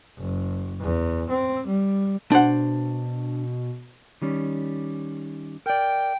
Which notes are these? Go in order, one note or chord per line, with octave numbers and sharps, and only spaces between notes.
F#1
E2
C4
G3
B2 D4 C5 F#5
D#3 G3 C#4
A#4 D5 G5